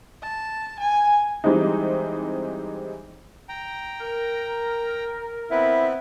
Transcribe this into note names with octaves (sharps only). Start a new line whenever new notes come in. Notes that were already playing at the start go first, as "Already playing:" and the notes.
A5
G#5
E3 G3 G#3 C4 D#4
G5 A#5
A#4
B3 C4 E4 B4